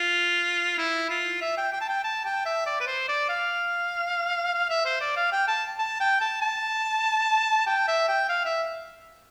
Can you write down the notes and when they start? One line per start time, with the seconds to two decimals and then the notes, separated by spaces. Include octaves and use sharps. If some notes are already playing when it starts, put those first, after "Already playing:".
Already playing: F4
0.78 E4
1.10 F4
1.41 E5
1.57 G5
1.72 G5
1.81 A5
1.89 G5
2.04 A5
2.25 G5
2.45 E5
2.66 D5
2.80 B4
2.87 C5
3.08 D5
3.29 F5
4.54 F5
4.70 E5
4.86 C5
5.01 D5
5.16 F5
5.32 G5
5.48 A5
5.79 A5
6.00 G5
6.21 A5
6.41 A5
7.67 G5
7.88 E5
8.08 G5
8.29 F5
8.45 E5